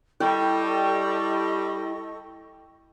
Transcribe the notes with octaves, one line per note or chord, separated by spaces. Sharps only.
G3 E4 A4 D#5 G5 C#6